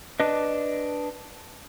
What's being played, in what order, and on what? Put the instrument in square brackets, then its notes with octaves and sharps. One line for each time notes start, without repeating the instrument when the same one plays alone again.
[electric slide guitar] D4 B4 D#5